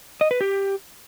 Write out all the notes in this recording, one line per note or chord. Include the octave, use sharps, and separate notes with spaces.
D#5
B4
G4